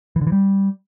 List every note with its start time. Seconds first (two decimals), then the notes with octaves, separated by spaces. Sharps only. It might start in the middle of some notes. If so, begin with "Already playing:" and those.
0.16 E3
0.21 D3
0.27 E3
0.32 G3